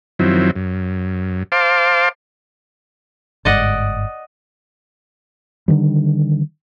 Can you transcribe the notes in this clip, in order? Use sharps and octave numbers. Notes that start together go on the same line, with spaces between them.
F#2 D#3 F3 F#3 C4 E4
F#2
C5 F5 A5 C6 D6
G1 G#2 D5 D#5 F#5
D3 D#3 G3